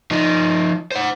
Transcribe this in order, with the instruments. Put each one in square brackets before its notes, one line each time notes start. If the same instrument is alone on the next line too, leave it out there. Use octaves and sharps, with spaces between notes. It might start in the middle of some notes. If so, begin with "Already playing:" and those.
[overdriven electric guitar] F3 D#4
C5 F#5